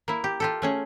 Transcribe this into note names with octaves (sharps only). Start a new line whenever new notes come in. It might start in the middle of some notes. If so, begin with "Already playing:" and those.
A#3 E4
G4
F4 G4 A4
A3 C#4 G#4